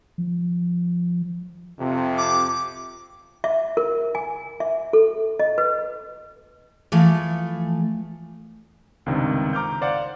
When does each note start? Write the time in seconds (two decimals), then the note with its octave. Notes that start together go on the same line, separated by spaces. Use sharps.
0.18 F3
1.78 F2 C3
2.17 D6
3.44 E5
3.77 A#4
4.15 G#5
4.60 E5
4.93 A4
5.39 D#5
5.58 B4
6.92 E3 F3 A3
9.06 C#2 G2 C3 D#3 C4
9.53 A#5 D6 F6 G6
9.81 C5 D5 F5 F#5